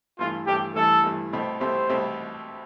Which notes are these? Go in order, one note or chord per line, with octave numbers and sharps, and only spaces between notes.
G2 E3 A3 F4
G2 E3 A3 G4
G2 E3 A3 A4
G2 E3 A3
C2 B2 A3 C4 G4
C2 B2 A3 C4 G4 C5
C2 B2 A3 C4 G4